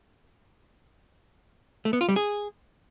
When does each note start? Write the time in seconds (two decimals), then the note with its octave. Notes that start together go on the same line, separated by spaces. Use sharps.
1.85 A3
1.93 B3
2.01 F4
2.09 G3
2.16 G#4